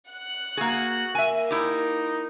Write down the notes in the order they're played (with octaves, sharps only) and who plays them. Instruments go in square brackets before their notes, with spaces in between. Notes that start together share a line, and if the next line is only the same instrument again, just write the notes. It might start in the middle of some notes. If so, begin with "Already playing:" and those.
[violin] F#5 F#6
[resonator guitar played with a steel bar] A#3 G#4 [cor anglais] F#4
[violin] A#3 [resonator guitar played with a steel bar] E5 G#5
[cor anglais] D#4 [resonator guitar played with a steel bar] E4 G4